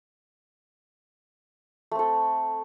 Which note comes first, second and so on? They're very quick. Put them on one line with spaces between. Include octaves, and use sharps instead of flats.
A3 C4 A4